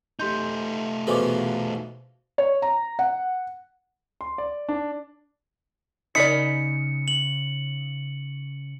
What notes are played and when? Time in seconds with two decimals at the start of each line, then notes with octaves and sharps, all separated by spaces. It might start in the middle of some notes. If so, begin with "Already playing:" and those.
0.19 A3 D#4 G4 C6 G6
1.07 E2 B2 F3 A4 G#5 D6
2.38 C#5
2.62 A#5
2.99 F#5
4.21 C6
4.38 D5
4.69 D4
6.15 C#3 D#4 A#4 D5 B5 C#7
7.08 F#7